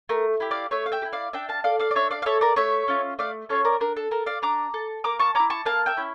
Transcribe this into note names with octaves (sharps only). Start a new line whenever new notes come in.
A3 A#4
E4 G4
D5 F5
A3 C#5 E5
F5
E5 G5
G4
E4
D5 F5
D4 E5 G5
F5 A5
A4 D5 F5
D5 F5
D5
D4 C#5 E5
D5 F5
F5
A4 C#5 E5
A#4 D5
A3 C#5 E5
C#4 F4
A3 D5 F5
C#4 F4 A4 C#5
A#4 D5
D4 A#4
A4
A4 A#4
D5 F5
D4 A#5 D6
A4
A#3 A#5 D6
A5 C#6
C#4 E4 A#5 D6
A5 C#6
A#3 F5 A5
E5 G5
C#4 E4